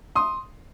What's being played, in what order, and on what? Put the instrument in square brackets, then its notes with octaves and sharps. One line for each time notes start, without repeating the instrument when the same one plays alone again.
[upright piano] C6 D#6